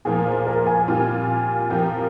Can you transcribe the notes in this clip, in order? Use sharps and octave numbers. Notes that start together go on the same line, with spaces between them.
A#2 F3 A#3 G#4
C5
A#4
G#5
A#2 G3 C4 F4
F3 C4 G4 A#4 G5